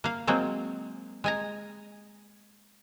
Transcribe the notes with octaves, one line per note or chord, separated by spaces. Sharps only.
A#3 F5
F#3 G#3 A#3 C4
G#3 G#5 A#5